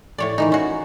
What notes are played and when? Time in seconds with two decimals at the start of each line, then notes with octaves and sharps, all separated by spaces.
0.18 A2 C#5 D5
0.38 D#3 E3 D#4
0.52 C#4 F#4